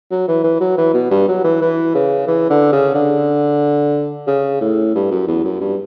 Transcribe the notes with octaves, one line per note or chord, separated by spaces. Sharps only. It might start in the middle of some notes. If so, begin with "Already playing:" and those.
F#3
E3
E3
F#3
E3
B2
G2
F#3
E3
E3
C#3
E3
D3
C#3
D3
C#3
A2
G2
F#2
E2
F#2
G2